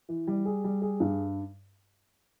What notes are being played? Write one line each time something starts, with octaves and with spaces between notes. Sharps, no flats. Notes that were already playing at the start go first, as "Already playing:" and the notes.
E3
G3
G#4
G3
G#4
G2